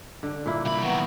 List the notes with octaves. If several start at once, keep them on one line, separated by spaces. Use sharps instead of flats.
D3
A#2 A#3 E4
C2 A#3 E4 B5
D#3 F#3 B3